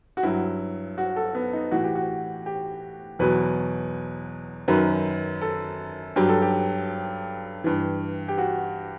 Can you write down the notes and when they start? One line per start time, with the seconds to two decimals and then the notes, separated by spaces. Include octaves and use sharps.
0.17 F#4
0.23 G2 F#3 E4
0.98 F#4
1.16 A4
1.35 B3
1.53 D#4
1.71 A2 E3 F#4
1.84 G4
1.95 F#4
2.46 G4
3.19 E2 B2 F#3 B4
4.68 F#2 D#3 F#3 B4
5.42 A4
6.16 G2 F#3 G4
6.29 A4
6.42 G4
7.64 G2 E3
8.28 G4
8.38 F#4